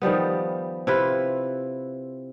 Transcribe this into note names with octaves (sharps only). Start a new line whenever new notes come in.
D#3 F3 G3 B3
C3 E4 F4 B4